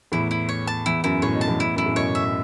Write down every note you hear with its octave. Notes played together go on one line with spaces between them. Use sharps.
E2 A2 E4
E4
C#5
A5
E2 E4
F#2 E4
A2 C#5
B2
A5
E2 A2
E4
F#2 E4
A2
F#2 B2 C#5
E5